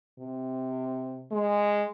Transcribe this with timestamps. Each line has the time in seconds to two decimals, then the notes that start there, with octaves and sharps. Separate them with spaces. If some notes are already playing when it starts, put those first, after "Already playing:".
0.20 C3
1.32 G#3